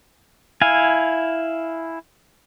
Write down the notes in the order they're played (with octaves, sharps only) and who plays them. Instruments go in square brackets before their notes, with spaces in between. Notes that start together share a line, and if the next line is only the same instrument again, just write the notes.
[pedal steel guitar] E4 F5 G#5